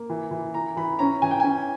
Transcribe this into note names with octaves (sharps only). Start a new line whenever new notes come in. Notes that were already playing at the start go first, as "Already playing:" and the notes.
Already playing: A#3
E3
E3
E3 A#5
E3 B5
C#4 A#5
E3 G#5
G5
C#4 G#5